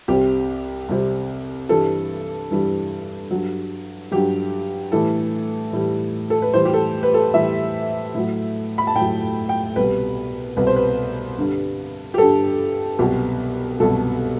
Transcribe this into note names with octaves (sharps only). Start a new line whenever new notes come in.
C2 C3 G3 G4
C2 C3 G3
G2 E3 G3 A4
G2 E3 G3
G2 F#3
G2 F#3 G4
A2 E3 G3 A4
A2 E3 G3
A4
B4
A2 E3 G3 C5
G4
A4
B4
A4
A2 E3 G3 E5
A2 F#3
B5
A5
A2 F#3 G5
G5
C2 B2 G3 B4
C2 B2 G3 B4
C5
B4
G2 D3 G3
G4
G2 D3 G3 A4
C2 B2 F#3 G4
C2 B2 F#3 A4